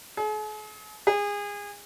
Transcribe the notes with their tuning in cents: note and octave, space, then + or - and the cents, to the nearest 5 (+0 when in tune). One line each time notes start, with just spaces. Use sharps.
G#4 +45
G#4 -25